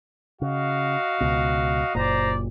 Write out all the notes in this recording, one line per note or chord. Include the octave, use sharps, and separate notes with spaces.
C#3 F#4 D#5 F5
C#2 B2
F#1 A#2 C5 D5 A#5